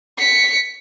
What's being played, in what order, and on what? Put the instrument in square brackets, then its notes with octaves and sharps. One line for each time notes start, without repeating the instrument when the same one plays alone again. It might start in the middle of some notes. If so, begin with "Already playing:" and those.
[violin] B6 C#7